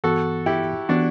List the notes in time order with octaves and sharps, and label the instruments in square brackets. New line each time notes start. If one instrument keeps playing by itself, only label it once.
[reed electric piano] G2 E3 B3 [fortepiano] F#4 A4
[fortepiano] E4 G4
[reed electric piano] E3 B3 [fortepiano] D4 F#4